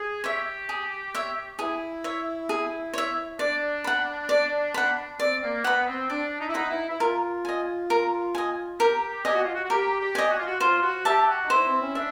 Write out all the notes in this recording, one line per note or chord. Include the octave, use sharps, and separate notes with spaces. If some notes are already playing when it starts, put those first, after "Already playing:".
Already playing: G#4
G4 C#5 E5
G#4
C#5 E5
E4 G#4
C#5 E5
G#4
C#5 E5
D4 D5
F#5 B5
D5
F#5 B5
C4 D5
A#3
B3 F#5 B5
C4
D4 D5
D#4
E4
D#4 F#5 B5
E4
E4
F4 A#4
D#5 G#5
A#4
D#5 G#5
G4 A#4
G4 D#5 G#5
F#4
F4
F#4
F#4
G4 A#4
G4
D#5 G#5
F#4
F4
F#4
F4 C5
F#4
G4 E5 A5
F#4
D#4
E4 C5
C4
C#4
D4 E5